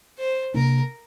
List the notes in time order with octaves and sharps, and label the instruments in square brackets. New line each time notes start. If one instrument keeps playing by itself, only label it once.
[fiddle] C5
[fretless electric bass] C3 A#3 D4 [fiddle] A#4